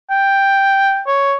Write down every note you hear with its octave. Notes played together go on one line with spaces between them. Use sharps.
G5
C#5